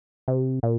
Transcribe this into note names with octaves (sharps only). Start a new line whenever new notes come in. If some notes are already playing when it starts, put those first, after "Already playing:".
C3
A#2